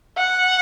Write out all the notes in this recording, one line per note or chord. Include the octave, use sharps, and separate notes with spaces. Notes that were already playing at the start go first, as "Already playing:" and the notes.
F#5